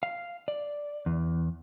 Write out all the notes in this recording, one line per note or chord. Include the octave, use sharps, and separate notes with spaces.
F5
D5
E2